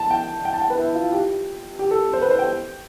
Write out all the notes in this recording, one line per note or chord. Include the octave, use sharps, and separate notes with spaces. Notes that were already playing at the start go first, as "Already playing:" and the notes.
Already playing: A5
G5
G5
A5
G5
B4
E4
F4
G4
G4
A4
C5
B4
C5
G5